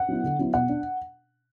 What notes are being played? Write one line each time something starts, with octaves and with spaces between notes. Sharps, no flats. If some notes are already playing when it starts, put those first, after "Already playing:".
Already playing: F#5
F#3 B3 E4
D3
F#3 B3 E4
B2 F#5
D4